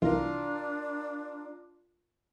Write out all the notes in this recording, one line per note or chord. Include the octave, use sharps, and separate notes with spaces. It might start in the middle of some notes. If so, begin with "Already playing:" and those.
C2 E3 D4 F4 A#4